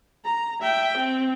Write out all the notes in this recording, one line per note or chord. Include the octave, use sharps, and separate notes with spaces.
A#5
E5 G5
C4